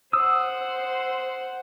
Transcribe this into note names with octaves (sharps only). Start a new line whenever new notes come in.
C5 F#5 D#6 E6